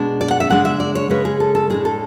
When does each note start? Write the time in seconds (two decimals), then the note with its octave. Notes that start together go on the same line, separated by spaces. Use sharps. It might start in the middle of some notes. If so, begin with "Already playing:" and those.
Already playing: B2 G#3 D4
0.21 D5
0.31 F#5
0.40 E5
0.50 C#3 G#3 D4 F#5
0.65 E5
0.80 D5
0.95 C#5
1.10 C#3 G#3 C#4 B4
1.25 G#4
1.40 A4
1.55 A4
1.70 A2 G#3 D4 G#4
1.85 A4